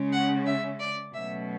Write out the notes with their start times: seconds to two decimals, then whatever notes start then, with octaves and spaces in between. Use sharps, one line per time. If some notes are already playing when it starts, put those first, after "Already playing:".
Already playing: C#3 G#3 C#4
0.12 F#5
0.46 E5
0.79 D5
1.13 B2 F#3 A3 C#4 E5